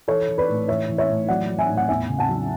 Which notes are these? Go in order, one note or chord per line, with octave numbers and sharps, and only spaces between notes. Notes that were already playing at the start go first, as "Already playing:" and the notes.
E3 A4 C#5
E3
B4 D5
A2
E3 C#5 E5
E3
C#5 E5
A2
F#3 D5 F#5
F#3
E5 G#5
A2
F#5
E2 E5 G#5
C#3
F#5 A5
F#3